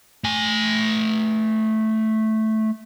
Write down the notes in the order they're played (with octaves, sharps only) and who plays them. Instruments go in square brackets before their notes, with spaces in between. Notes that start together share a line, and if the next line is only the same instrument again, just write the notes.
[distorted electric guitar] A3 G#5